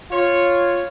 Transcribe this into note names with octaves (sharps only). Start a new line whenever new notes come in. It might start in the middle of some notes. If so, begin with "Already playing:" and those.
F4 C#5